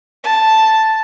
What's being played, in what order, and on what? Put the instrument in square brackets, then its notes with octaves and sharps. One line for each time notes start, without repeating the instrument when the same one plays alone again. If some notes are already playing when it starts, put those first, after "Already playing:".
[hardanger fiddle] A5